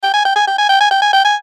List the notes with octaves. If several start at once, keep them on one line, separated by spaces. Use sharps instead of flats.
G5
G#5
G5
G#5
G5
G#5
G5
G#5
G5
G#5
G5
G#5